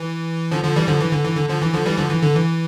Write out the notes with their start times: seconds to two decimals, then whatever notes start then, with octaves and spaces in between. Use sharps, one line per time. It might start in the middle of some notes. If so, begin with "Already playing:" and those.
Already playing: E3
0.51 D3 F3
0.64 D3 F3
0.76 E3 G3
0.88 D3 F3
1.01 E3
1.13 D3
1.25 E3
1.37 D3
1.49 D3 F3
1.62 E3
1.73 D3 F3
1.86 E3 G3
1.98 D3 F3
2.11 E3
2.23 D3
2.35 E3